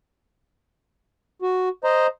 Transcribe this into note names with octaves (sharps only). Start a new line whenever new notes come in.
F#4
C5 D#5 A#5